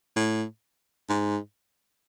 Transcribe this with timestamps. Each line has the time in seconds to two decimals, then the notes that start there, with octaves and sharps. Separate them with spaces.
0.16 A2
1.09 G#2